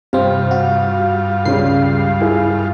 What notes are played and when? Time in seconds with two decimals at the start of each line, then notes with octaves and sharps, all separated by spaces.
0.13 G2 C3 C4 F4 F5
0.51 F#4
1.45 C#2 C#3 G3 C7
2.21 E4 G#4 F5